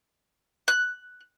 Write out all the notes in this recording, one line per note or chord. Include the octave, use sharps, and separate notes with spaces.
F#6